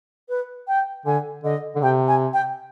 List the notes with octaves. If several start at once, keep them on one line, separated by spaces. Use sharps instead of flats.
B4
G5
D3 G#5
D3 D#5
D3
C3 G5
G#5
G5